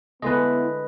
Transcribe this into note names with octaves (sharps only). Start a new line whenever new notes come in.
D3 G#3 A3 B3 E4 B4 D#5